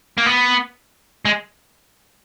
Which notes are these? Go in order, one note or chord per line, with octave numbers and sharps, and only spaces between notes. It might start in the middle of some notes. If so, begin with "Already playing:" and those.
A#3
B3
G#3